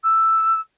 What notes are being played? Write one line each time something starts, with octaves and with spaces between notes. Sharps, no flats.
E6